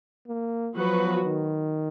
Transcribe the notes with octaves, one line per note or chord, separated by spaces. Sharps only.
A#3
F3 F#3 B3 F#4 B4
D#3